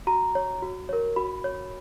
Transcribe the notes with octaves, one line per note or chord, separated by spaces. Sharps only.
F#4 A#5
C#5
F#4
A#4 C#5
F#4 B5
C#5